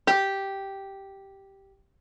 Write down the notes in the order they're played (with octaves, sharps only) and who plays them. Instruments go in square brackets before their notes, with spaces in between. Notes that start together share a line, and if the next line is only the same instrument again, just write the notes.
[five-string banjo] G4